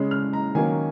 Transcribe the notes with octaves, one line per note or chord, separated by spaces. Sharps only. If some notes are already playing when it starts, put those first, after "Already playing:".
Already playing: C#3 G#3 C#4
F6
A#5
D#3 F#3 A#3 C#4 G#5